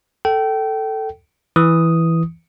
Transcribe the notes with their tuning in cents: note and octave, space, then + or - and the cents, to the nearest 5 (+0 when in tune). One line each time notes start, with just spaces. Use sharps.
A4 +5 G5 -25
E3 +0 D#6 +0